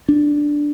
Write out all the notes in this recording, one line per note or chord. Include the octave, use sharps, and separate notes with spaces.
D4